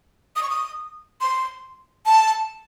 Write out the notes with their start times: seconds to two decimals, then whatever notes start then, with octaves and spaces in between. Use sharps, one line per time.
0.36 D#6
0.43 C#6
0.50 D#6
1.21 C6
2.06 A5